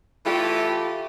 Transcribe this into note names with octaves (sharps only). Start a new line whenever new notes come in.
E3 A3 E4 F4 G4